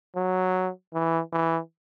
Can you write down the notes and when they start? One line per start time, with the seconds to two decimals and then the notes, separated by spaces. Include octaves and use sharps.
0.16 F#3
0.94 E3
1.33 E3